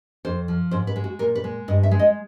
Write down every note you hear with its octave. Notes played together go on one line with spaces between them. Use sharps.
F2 C5
F3
G#2 C5
B4
G#3
F#4
A#2 A#4
B4
G#3
G2 D#5
E5
G#3
D#5